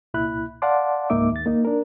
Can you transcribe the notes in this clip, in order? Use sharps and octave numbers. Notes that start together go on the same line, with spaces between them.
C2 A#2 E4 B5 F#6
D5 F5 F#5 A5 C6 D6
C#2 G#2 A#3 D#4 E5 D6
D#2 A6
A#3 D#4
D4 A#4